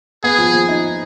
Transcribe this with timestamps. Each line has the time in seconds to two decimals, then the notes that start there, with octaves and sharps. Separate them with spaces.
0.23 B3 G#4
0.38 F3
0.53 F3
0.69 D#4